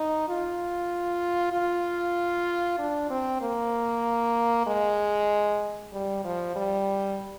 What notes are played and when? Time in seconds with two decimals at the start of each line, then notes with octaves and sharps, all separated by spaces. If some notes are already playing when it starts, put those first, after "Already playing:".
Already playing: D#4
0.28 F4
1.53 F4
2.79 D4
3.10 C4
3.42 A#3
4.67 G#3
5.93 G3
6.24 F3
6.56 G3